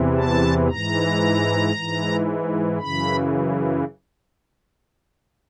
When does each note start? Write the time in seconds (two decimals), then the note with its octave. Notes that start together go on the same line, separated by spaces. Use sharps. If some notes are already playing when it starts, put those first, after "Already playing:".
Already playing: E2 C3 E3
0.17 A5
0.69 G#2 E3 A#5
1.74 G#2 E3
2.79 F#2 C#3 E3 B5